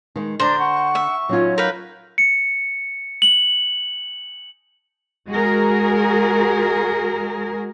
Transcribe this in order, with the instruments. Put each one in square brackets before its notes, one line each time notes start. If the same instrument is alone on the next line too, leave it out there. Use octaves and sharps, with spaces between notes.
[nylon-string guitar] D#3 G#3
[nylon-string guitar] D3 [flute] D4 [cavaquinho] C5 A#5
[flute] F#5 [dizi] C#6
[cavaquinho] E5
[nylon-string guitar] F#3 D#4 F4 [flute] C#4
[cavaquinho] A#4 B4 B5 [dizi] F5 [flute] G6
[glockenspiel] C#7
F#7
[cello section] G#3 F#4 G#4 A#4